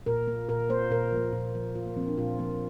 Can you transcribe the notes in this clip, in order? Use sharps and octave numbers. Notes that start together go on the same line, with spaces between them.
A#2 A#4
A#3
A#2 A#4
A#3 C5
A#2 A#4
F3 A#3
A#2
F3 A#3
A#2 F4
A#3
F3 A#3 C4
D4
A#2 F4
F3 A#3